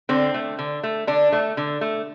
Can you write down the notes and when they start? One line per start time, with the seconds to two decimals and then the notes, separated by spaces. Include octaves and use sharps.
0.09 D3 C4
0.34 A3
0.59 D3
0.83 A3
1.07 D3 D4
1.32 A3
1.57 D3
1.81 A3